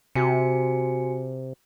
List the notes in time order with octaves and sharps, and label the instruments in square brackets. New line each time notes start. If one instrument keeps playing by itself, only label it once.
[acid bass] C3 [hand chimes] F#4 G#5 C#7